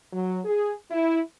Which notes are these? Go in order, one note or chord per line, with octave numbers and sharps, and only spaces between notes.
F#3
G#4
E4